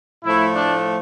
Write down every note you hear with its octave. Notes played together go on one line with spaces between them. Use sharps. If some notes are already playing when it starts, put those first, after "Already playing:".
A2 F3 A3 E4
D4